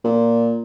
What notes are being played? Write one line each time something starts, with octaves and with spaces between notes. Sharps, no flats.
A#2